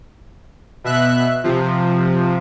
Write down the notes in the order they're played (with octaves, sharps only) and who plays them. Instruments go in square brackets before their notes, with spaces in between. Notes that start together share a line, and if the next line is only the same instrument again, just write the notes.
[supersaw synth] B2 E5 F#6
C3 F3